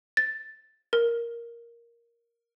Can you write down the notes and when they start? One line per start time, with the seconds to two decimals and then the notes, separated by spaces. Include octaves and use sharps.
0.17 A6
0.93 A#4